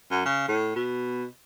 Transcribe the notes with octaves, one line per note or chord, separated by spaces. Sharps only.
F#2
C#3
A2
B2